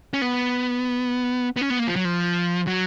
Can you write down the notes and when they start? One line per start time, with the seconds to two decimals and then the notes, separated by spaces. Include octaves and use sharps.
0.13 C#4
0.22 B3
1.56 B3
1.61 C#4
1.70 B3
1.79 A#3
1.88 F3
1.96 F#3
2.05 F3
2.67 F#3